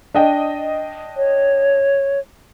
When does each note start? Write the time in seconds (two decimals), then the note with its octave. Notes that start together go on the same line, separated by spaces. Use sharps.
0.14 D4 D#5 G5
1.17 C#5